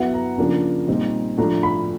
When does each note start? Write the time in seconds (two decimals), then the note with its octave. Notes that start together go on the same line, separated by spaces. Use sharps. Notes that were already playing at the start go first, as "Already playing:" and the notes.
Already playing: F#3 B3 E4 F#5
0.14 A#5
0.38 C#3 F3 A#3 D4
0.88 A#2 G3 C4 D#4
1.38 A2 F3 A3 D4 A#5
1.63 B5